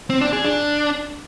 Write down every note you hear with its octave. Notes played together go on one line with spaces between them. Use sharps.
C4
D4
G#4
D4